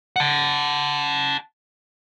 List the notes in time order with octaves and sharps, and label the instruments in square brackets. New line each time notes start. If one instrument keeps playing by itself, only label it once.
[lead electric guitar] F#5 A5